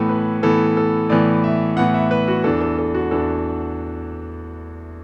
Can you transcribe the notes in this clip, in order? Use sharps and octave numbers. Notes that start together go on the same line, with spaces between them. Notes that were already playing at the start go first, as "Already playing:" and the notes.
Already playing: A2 E3 B3 A4
B4
A2 E3 B3 A4
A4
A2 E3 B3 D5
E5
A2 E3 B3 F#5
E5
B4
F#4
E2 E3 D4 A4
A4
A4
F#4
E2 E3 D4 A4